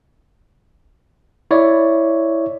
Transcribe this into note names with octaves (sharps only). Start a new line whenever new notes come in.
E4 C#5 D5 E5